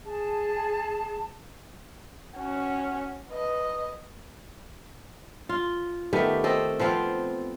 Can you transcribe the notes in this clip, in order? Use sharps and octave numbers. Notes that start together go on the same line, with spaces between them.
G#4 A5
C#4 F#4
B4 D#5
F4
D#3 A3 B3 G4
C4 A4 D#5
F3 B3 C4 F4